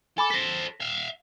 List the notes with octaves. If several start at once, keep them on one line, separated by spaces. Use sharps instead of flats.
A4 G#5 B5 D6
A4 C5 A#6 B6
E5 F5